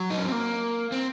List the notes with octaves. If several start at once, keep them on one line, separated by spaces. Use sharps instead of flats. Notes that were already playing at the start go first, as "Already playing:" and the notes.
Already playing: F#3
D#4
C#4
C4
A#3
C4